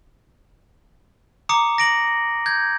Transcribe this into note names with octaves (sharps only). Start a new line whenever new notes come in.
A#5 D6 D#6 C#7
A#6 D7 F#7
G6 G#6